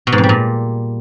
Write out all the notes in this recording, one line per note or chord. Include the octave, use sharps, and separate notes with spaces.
B2
G#2
F2
G3
A#2